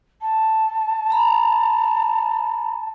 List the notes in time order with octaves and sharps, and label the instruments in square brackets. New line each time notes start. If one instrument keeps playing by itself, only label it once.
[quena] A5
[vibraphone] A#5 B5